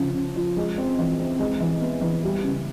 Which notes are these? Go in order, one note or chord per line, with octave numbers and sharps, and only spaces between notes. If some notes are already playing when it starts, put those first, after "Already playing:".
Already playing: C#3 F3
C#3
F3
G#3
C4
E3
C4
G#3
E3
B3
E3
G3
C#3